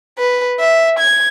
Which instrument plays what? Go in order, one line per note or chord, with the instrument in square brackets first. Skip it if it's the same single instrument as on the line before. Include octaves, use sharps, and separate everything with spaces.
[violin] B4
E5
G#6